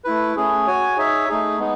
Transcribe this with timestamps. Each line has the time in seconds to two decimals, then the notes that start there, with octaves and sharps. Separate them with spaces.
0.04 A3 E4 B4
0.36 A3 C#4 G#4
0.67 F#4 C#5 G#5
0.97 D#4 G#4 C#5 E5
1.29 A3 D#4 G#4
1.58 G#3 B3 D#4